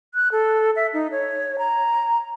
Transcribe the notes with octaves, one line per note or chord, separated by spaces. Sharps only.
F#6
A4
E5
D#4
C#5
A#5